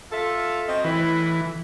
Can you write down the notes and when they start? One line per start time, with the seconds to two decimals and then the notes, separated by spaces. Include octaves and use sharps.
0.12 F4 A4 E5
0.67 C4 F#4 D#5
0.84 A2 E3 E4 B4